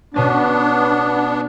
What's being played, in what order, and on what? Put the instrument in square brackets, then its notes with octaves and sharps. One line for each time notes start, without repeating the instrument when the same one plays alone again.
[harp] B2 C#4 A6 [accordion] B3 D4